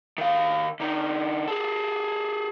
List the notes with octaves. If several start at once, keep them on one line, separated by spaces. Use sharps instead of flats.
D#3 F5
D3 D#4
G#4 A4